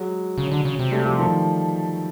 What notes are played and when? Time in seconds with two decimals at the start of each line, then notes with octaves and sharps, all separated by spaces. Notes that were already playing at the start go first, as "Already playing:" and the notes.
Already playing: F#3 G#3
0.38 C#3
0.52 D3
0.65 C#3
0.79 C3
0.92 G3 A3
1.05 F3 G3
1.19 D#3 F3